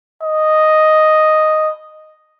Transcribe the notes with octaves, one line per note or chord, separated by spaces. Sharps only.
D#5